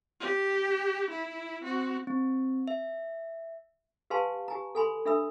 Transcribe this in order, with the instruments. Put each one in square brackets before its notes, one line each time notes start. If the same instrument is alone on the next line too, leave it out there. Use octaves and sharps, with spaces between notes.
[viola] G4
E4
C4 F#4
[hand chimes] C4
E5
[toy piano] G4 B4 F5 G#5 A5 C6
G4 G#5 A#5
A4 G#5 B5 C6
D4 A4 E5 B5 E6